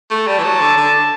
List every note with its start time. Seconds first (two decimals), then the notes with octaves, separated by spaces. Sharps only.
0.11 A3
0.27 G3 A5
0.39 E3
0.44 F#3
0.61 D3
0.77 D3